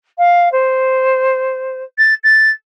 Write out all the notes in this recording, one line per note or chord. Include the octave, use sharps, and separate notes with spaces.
F5
C5
A6
A6